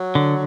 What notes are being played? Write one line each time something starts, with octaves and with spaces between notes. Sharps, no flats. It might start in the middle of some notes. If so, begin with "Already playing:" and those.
Already playing: F#3
D3